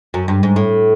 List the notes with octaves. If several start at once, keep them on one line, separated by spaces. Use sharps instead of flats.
F#2
G2
G#2
A2